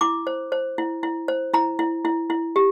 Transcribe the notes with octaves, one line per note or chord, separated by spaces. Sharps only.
E4 D6
C5
C5
E4
E4
C5
E4 A#5
E4
E4
E4
G4